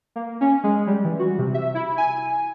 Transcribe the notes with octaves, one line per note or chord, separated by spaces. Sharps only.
A#3
C#4
G#3
G3
E3
F#4
C3
E5
E4
G#5